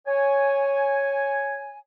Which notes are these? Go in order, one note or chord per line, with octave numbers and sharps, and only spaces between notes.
C#5 G#5